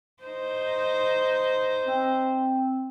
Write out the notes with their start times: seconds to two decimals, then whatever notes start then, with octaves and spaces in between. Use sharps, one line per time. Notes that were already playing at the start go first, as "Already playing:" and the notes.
0.23 D#4 C5
1.85 C4